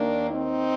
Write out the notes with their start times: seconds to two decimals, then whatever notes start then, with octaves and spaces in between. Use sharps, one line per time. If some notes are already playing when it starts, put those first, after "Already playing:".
Already playing: D#2 D#3 A#3 D4
0.30 C4 D#4